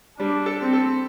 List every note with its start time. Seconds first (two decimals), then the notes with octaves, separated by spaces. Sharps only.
0.19 G3 D4
0.46 A4
0.59 C4
0.73 A4